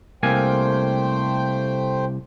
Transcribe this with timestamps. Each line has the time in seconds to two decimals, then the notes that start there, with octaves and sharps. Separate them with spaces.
0.23 C2 A3 A#3 C5 G5 G#5